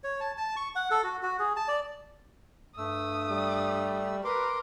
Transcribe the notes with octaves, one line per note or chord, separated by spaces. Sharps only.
C#5
A5
A5
C#6
F#5
A4
F#4
F#4
G#4
A5
D5
G2 A3 D#6 E6
G3
A#4 B4 C6 D6